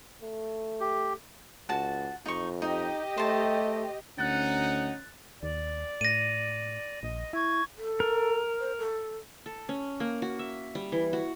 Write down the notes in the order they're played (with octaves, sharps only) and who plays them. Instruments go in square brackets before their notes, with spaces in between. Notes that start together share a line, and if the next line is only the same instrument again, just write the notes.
[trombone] A3
[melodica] G4
[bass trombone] C#2 [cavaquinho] F#4 A5
[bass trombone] F2 [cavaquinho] D#4 C#6
[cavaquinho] D#4 [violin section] G4 D#5
[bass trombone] A3 [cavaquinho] C5 A5
[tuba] D2 [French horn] C#4 [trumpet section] D#4 F#5 [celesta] F#6 A6
[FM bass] D#2 [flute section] D5
[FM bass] A2 [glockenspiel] A#6 D#7
[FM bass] A#1 [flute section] D#5
[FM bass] E4 [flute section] C#6 G#6
[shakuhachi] A4
[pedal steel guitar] A#4
[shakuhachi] C5
A4
[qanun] A4
C#4
A#3
F#4
E5
G3
E3
F#4